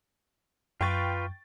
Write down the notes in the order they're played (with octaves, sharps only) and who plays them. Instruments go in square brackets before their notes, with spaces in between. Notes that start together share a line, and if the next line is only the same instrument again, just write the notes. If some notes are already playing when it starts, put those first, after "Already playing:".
[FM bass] F#2 [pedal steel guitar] F4 B4 [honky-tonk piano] G5 C#6 A6